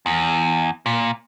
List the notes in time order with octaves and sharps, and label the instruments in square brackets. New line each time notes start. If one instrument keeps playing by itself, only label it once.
[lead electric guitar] E2
A#2